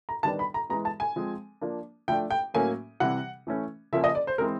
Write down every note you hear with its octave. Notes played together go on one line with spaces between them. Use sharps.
A#5
D#3 G3 B3 D4 A5
B5
A#5
E3 G#3 B3 A#5
A5
G#5
F3 G#3 C4
F3 A#3 D4
F3 A3 D4 G5
G5
A2 F#3 A#3 C#4 G#5
C3 E3 G3 F#5
E3 A3 C#4
C#3 F3 A#3 C#4 E5
D#5
D5
C5
E3 G#3 C4 A#4